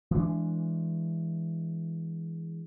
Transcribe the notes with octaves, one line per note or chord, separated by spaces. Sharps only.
E3 G#3 D4